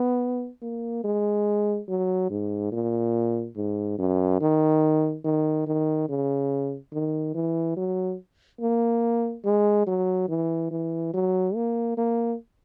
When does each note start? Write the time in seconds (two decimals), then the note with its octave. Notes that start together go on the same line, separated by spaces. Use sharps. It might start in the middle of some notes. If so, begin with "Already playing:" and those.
Already playing: B3
0.62 A#3
1.04 G#3
1.89 F#3
2.30 G#2
2.72 A#2
3.56 G#2
3.98 F#2
4.41 D#3
5.25 D#3
5.67 D#3
6.09 C#3
6.93 D#3
7.35 E3
7.77 F#3
8.61 A#3
9.45 G#3
9.87 F#3
10.29 E3
10.71 E3
11.14 F#3
11.55 A#3
11.97 A#3